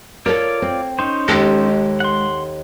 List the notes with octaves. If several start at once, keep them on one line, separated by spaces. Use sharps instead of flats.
F4 A4 A#4 C#5 D5
C4
C#4 D#4 C5
D#2 G#3 A4
F#5 C6